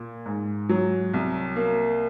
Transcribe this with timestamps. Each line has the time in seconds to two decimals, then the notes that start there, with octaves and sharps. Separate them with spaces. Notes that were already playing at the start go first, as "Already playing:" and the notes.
Already playing: A#2
0.26 G#2
0.69 F#3
1.14 C2
1.56 A#3